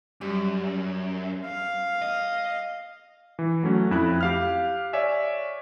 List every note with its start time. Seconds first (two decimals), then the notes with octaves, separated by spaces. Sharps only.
0.21 F#2 G3
1.45 F5
2.02 D#5
3.39 E3
3.63 F#3 A3 C#4 F#4
3.91 F2 E4 E5 F#6
4.21 G4 F5 F6
4.93 C#5 D5 E5 G#5